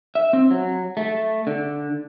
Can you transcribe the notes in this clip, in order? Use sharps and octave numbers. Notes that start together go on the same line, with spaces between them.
E5
C4
F#3
A3
D3